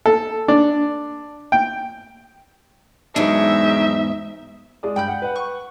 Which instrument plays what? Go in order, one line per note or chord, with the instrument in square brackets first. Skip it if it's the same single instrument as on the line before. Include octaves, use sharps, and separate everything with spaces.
[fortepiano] A4
D4
G5
[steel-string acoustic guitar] E2 G#2 [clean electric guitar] F#3 G#3 D4 [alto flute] D#4 [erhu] E5
[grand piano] G#3 D5 D#6
[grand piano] G2 [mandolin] G5 B5 G6
[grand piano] F#5
B4 F#5
[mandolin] C#6